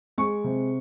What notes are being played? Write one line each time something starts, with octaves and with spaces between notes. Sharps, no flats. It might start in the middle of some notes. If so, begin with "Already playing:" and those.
G#3 C#6
C3